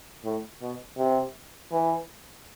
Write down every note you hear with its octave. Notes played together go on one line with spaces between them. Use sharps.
A2
B2
C3
E3